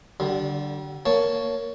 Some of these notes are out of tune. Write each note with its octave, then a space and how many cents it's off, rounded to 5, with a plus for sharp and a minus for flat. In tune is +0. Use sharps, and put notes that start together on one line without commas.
D3 +0 G3 -35
A#3 +0 C#5 +10 A5 +0